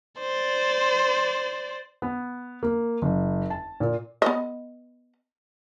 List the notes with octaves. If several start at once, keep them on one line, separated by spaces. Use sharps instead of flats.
C5 D5
B3
A#3
F#1
A5
A#2
B3 D#5